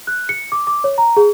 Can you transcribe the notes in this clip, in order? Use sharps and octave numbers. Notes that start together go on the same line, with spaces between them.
F#6
C#7
D6
D6
C#5
A#5
G#4